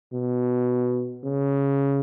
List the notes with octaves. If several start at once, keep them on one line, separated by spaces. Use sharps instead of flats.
B2
C#3